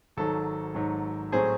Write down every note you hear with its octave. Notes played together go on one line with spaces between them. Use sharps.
G#1 G#2 F#3 A4
G#1 G#2 F#3
A2 F#3 A3 C4 G#4 C5